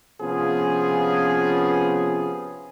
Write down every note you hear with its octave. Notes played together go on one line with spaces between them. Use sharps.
C3 F3 B3 C#4 F4 G#4